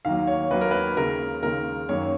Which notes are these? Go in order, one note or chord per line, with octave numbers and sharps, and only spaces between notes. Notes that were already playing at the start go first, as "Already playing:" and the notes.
D#2 D#3 F#3 A#3 F5
C#5
D#2 D#3 F#3 A#3 B4
A#4
B4
D#2 C#3 G#3 A#4
D#2 C#3 G#3 A#4
F#2 D#3 A#3 C#5